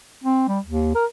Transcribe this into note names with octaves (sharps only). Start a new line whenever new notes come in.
C4
G3
D#2
A#4